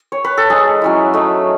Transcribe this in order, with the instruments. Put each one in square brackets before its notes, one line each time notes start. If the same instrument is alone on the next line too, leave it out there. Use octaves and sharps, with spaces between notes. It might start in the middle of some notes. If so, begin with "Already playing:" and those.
Already playing: [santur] D#5
C#5
B4
A4
G#3 D#4 G#4
F#3 C#4 E4
A3 D#4